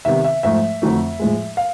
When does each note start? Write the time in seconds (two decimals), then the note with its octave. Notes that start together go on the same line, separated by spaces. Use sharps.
0.05 C3 D#3 G3 B3 E5
0.25 E5
0.43 G#2 F3 A3 E5
0.82 F2 D3 F#3 A3
1.19 A2 F3 G#3
1.57 F5